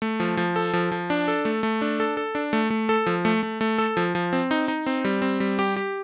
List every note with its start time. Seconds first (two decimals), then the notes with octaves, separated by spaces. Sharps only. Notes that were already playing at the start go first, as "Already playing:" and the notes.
0.02 A3
0.20 F3
0.37 F3
0.56 A4
0.73 F3
0.92 F3
1.10 D4
1.28 A4
1.45 A3
1.63 A3
1.81 D4
2.00 A4
2.17 A4
2.35 D4
2.53 A3
2.70 A3
2.89 A4
3.06 F3
3.25 A3
3.43 A3
3.61 A3
3.78 A4
3.97 F3
4.15 F3
4.33 C4
4.51 D#4
4.68 D#4
4.86 C4
5.05 G3
5.22 C4
5.40 G3
5.59 G4
5.76 G4